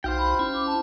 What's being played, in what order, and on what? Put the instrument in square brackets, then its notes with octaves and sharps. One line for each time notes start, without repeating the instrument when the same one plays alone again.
[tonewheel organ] B1 D#4 F#4 [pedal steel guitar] C5 F5 G5
[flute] B5
[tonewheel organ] C#4 E4
[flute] D6
A5